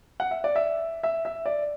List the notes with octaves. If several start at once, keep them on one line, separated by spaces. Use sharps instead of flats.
F#5
E5
D5
E5
E5
E5
D5